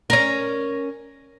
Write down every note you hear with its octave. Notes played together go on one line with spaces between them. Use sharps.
C#4 A#4